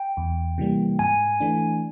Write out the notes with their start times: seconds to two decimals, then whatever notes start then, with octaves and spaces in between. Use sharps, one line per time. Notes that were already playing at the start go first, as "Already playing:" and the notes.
Already playing: G5
0.17 E2
0.58 C3 E3 G3 A#3
0.99 G#2 G#5
1.40 E3 A3 D4